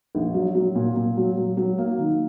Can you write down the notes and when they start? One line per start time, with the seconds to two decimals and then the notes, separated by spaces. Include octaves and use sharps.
0.15 A#1
0.34 F#3
0.55 F#3
0.75 A#2
0.96 A#2
1.17 F#3
1.37 F#3
1.57 F#3
1.78 A#3
1.99 D#3